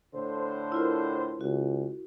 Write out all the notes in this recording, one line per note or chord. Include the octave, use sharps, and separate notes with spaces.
A2 D3 C5
E4 F4 A#4
C#2 F#4